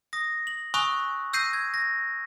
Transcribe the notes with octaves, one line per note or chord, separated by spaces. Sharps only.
D#6 A#6
F#7
G#5 B5 C#6 D#6 E6 F#6
E6 G6 A#6 C7 D#7
G#6
A#6